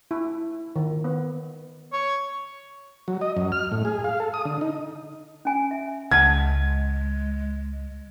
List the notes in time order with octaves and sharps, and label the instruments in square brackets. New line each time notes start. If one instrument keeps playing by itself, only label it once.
[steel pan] E4
D#3
B3
[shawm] C#5
[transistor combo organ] F#3
D#5
F#2
F6
A2
G#4
F5
A4
D#6
D3
D#4
[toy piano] C#4 G#5
E5
[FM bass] C#2 [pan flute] G#3 [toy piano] F#5 A5 [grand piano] G#6